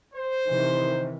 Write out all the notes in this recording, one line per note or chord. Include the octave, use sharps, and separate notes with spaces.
C5
C3 D#3 E3